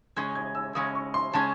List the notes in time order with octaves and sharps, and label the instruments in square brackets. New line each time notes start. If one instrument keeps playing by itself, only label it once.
[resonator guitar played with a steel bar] C#3 G#3 C#4 [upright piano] G#6
[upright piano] G#6
E6
[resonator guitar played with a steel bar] C#3 G#3 C#4 [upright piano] D#6
[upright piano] C#6
C6
[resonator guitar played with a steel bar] C#3 G#3 C#4 [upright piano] A5